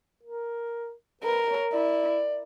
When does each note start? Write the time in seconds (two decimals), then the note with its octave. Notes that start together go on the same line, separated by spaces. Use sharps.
0.23 A#4
1.22 A#4 B4
1.48 C#5
1.72 E4 D5